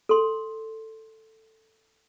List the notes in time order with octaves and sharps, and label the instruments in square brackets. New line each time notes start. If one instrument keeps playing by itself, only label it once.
[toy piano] A4 C6